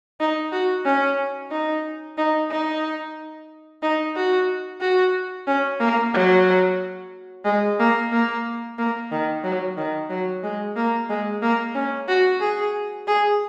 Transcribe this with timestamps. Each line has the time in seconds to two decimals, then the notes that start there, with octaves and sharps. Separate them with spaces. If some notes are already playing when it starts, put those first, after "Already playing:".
0.20 D#4
0.52 F#4
0.85 C#4
1.51 D#4
2.18 D#4
2.50 D#4
3.83 D#4
4.16 F#4
4.81 F#4
5.47 C#4
5.80 A#3
6.14 F#3
7.45 G#3
7.80 A#3
8.12 A#3
8.78 A#3
9.12 D#3
9.44 F#3
9.77 D#3
10.10 F#3
10.44 G#3
10.76 A#3
11.09 G#3
11.42 A#3
11.75 C#4
12.09 F#4
12.41 G#4
13.08 G#4